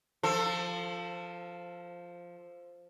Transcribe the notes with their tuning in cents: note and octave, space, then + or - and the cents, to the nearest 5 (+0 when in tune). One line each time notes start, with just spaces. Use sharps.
F3 +0 A4 +20